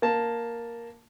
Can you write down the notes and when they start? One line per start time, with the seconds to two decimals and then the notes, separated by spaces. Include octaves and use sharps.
0.02 A#3 A5